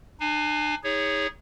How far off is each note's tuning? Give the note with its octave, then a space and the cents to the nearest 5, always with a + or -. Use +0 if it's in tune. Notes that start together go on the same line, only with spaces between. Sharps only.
D4 +45 G#5 +0
D#4 +35 G#4 -25 C#5 +0